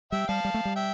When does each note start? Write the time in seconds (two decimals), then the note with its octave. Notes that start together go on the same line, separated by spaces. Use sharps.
0.12 G3 E5 G5
0.28 G3 F5 A5
0.45 G3
0.54 A3
0.65 G3
0.76 E5 G5